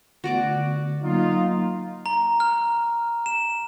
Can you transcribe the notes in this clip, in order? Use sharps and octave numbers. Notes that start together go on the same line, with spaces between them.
D3 A3 B3 F#4 D5 D6
F#3 A#3 D#4 F4
A#5
F6
E7